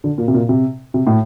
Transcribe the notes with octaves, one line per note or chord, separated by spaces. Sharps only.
D3
A#2
C3
A#2
C3
C3
A2